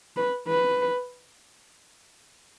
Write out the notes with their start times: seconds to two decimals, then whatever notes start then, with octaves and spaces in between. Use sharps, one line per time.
0.16 B4
0.48 B4